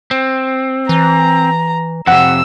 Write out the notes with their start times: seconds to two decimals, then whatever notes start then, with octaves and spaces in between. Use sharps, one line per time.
0.11 C4
0.89 E3 A#5
2.07 F2 C3 F#5 E6